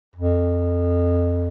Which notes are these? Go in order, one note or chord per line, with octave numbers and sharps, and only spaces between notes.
F2